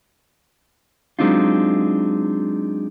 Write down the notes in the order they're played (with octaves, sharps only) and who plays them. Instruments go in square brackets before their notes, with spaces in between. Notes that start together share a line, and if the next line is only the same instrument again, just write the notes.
[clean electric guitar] F#3 G#3 C4 D4 D#4 F4